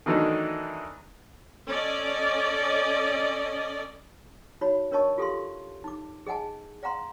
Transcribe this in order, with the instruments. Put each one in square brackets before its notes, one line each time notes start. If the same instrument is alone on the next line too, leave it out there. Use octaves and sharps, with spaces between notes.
[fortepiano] D#3 E3 F#3 A3 D4 D#4
[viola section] C#4 A4 D5 D#5
[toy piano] D#4 F#4 C#5 B5
D4 A#4 C#5 D#5 A5 C#6
F4 G4 A4 E5 F5 C6
D#4 D6
G#4 D#5 F#5 G#5 A5
D5 F5 F#5 A#5 C6